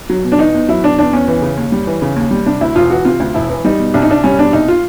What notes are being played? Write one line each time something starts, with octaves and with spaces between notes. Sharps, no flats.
F#3
B2
D4
E2 D#4
E2
F#3 E4
B2 D4
E2 D4
E2 C#4
E3
C#3
D#2
G3
E3
C#3
D#2
G3
C3 D4
D2 E4
E1 F4
E3 F#4
C3 F4
D2
E1 E4
E3
G3 D#4
B2
C2 D4
D#4
C2 D4
G3 C#4
B2 D4
C2 D#4
F4